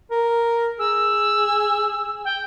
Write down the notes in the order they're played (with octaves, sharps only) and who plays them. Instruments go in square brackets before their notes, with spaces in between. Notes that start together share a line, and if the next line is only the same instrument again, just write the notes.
[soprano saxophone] A#4
[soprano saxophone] G#4 [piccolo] E6
[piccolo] G5